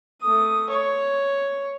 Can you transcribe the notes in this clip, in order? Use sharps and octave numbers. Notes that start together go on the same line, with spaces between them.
A3 D#6
C#5